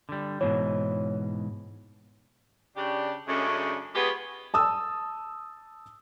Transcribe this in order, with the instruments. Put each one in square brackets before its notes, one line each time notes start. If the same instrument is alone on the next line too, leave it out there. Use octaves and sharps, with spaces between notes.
[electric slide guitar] D3 G3
[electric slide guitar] G#2 B2 E3 [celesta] C#5
[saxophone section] C#3 D4 G4
F#2 C#3 G#3 A3 C#4 D4
G#3 B3 F4 G4 B4 C#5
[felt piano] A5 D#6 E6